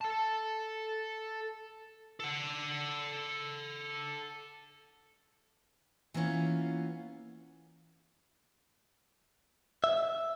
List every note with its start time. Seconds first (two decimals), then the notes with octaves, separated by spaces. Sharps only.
0.01 A4 A5
2.20 A4 F#5
6.14 E3 A#3 B3 C#4 F4
9.84 E5